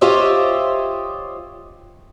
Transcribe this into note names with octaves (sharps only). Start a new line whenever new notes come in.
F4 G4 C5 C#5 D#5 E5